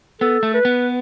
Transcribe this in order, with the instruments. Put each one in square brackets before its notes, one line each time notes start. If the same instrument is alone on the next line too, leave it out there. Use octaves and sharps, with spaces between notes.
[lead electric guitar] B3 [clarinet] A4
[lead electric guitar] A3
[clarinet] B4
[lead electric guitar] B3